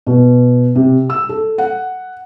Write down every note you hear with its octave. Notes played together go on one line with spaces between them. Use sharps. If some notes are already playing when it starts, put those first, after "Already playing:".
B2
C3
E6
A4
F#5